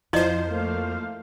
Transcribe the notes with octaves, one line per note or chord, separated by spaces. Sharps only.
F2 F3 E4 C5 D5 D#5
A3 A#3 F5